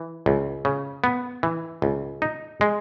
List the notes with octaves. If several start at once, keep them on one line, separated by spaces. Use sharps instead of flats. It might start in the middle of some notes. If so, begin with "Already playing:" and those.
Already playing: E3
C#2
C#3
B3
E3
C#2
D#4
G#3